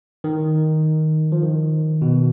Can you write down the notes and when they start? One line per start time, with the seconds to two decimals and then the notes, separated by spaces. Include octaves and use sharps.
0.24 D#3
1.32 F3
1.43 D#3
2.02 B2